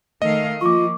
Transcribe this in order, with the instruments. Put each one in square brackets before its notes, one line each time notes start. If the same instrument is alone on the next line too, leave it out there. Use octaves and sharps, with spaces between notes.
[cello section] D#3 A3 F5 [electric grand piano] D#5
[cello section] F3 A#3 [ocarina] F4 [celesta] C#6 D6